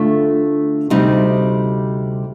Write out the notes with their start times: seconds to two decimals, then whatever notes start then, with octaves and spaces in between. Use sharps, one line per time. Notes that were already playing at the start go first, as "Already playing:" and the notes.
Already playing: D3 A3 D4 F4
0.90 D2 C3 G3 C4 D#4